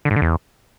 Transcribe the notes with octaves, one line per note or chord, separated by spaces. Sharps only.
D3
G#2
D3
E2